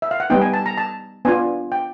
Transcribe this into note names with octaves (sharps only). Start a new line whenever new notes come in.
E5
F5
F#5
G3 B3 D#4 G5
G#5
A5
A#5
A5
B3 D4 F4 G#5
G5